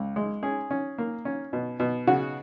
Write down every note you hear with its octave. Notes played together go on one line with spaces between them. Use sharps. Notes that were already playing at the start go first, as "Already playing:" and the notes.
Already playing: C#2
G#3
C#4 G#4
C#4
A#3
C#4
B2
B2
C#3 F#4